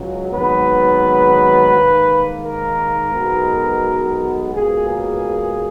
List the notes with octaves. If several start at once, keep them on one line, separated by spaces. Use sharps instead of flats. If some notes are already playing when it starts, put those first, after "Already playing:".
Already playing: C#2 C#3 F#3
G#1 G#2 D#3 F#3 B3 B4
G#2 D#3 A#3
A#4
B1 B2 G#3 B3
C#2 B2 A#3 G#4
G#4